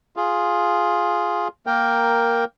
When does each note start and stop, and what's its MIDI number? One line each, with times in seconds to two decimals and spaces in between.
0.16 1.48 65
0.16 1.48 68
1.67 2.44 58
1.67 2.44 70
1.67 2.44 79